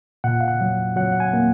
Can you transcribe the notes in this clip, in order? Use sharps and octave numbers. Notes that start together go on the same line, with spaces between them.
A#2 F#5
F5
F#5
F#3
F#3 F#5
F#5
G#5
A#3